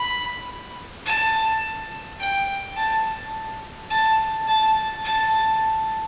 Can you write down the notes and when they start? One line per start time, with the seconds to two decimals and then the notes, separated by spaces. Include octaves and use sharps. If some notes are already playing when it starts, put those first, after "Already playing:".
Already playing: B5
1.06 A5
2.20 G5
2.76 A5
3.91 A5
4.47 A5
5.04 A5